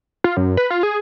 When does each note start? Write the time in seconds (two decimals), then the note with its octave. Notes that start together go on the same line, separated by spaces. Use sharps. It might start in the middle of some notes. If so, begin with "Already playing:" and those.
0.24 F4
0.37 F#2
0.57 B4
0.70 F4
0.83 G#4